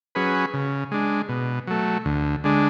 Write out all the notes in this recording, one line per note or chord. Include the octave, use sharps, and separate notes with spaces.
F#3 C#4 G#4 B4
C#3
G#3 D4
B2
F#3 A3
D2
D3 G#3 D4